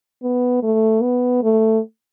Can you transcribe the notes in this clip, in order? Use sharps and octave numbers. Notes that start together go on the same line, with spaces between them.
B3
A3
B3
A3